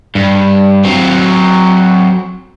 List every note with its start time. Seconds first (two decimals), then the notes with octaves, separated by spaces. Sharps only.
0.15 G2
0.85 F#3 C4